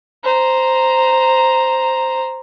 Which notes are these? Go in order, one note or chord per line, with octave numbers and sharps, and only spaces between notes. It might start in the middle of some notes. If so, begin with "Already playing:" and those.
C5 A#5